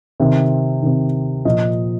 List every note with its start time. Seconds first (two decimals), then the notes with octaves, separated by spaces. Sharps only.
0.20 C3 D#3
0.83 C3 D#3
1.45 A#2 F3 D#5